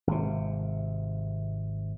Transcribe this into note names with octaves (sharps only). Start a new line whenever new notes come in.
G#1 C3